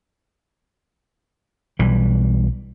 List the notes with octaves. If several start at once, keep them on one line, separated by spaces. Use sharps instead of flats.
B1 E3 G3